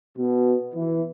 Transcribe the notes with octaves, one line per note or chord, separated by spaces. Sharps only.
B2
E3